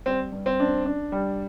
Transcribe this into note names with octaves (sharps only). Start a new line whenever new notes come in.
G3 C4
G2
C4
D4
D4
G3